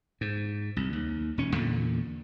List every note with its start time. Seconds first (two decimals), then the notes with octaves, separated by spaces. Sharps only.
0.21 G#2
0.76 C2
0.93 D#2
1.38 E1 C#4
1.54 E2 A#2 D3